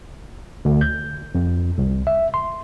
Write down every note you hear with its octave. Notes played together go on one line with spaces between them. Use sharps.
D2
G6
F2
C2
E5
C6